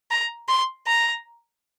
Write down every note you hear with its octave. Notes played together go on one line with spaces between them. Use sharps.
A#5
C6
A#5